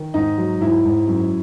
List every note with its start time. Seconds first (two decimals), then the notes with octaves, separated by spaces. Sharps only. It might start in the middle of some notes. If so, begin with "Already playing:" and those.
Already playing: D#3
0.14 G#2 D#4
0.38 F#3
0.61 G#2 E4
0.85 G#2
1.07 F#2